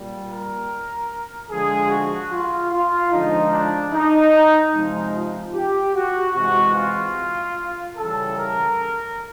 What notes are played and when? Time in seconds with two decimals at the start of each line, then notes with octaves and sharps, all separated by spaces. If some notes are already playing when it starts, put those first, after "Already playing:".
Already playing: A#2 G3
0.29 A#4
1.50 D3 F3 G#3 G#4
1.90 F#4
2.31 F4
2.72 F4
3.12 D3 F3 G#3 D#4
3.52 D4
3.92 D#4
4.74 C3 F3 G#3
5.14 F4
5.55 G4
5.95 F#4
6.35 C3 E3 G#3 F#4
6.75 F4
7.97 C#3 E3 G3 A4
8.38 A#4